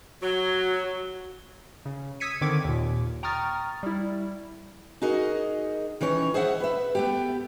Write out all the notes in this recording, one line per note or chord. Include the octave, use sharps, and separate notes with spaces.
F#3 F#4
C#3
D#6 E6 G#6 B6 C#7 D#7
D3 D#3 C4 D6 G#6 D7
D#2 A#2
G5 A#5 C#6 D#6 F6 A6
G3 E4
D#4 F#4 G#4 A#4 D#5
D#3 E3 C#4 C#5
G#4 C5 D#5 E5 F#5
B4 E5
A3 B3 G4